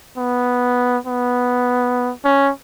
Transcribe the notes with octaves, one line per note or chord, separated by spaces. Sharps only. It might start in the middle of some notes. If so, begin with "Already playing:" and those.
B3
B3
C#4